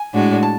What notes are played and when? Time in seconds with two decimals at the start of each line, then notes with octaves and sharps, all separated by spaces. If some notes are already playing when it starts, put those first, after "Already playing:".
Already playing: G#5
0.13 A2 G#3 D4 F#4
0.43 A5